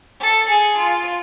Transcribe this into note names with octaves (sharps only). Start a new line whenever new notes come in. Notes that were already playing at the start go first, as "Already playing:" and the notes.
A4
G#4
F4